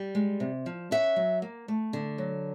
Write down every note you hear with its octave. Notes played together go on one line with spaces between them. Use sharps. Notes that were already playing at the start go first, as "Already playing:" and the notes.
Already playing: G3
G#3
C3
F3
C#4 E5 F#5
F#3
A#3
A3
D3
F#3